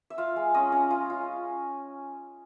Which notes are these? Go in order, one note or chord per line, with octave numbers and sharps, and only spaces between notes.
E5
F4 F5
G#3
C#4 D#5
C#4
F4
F4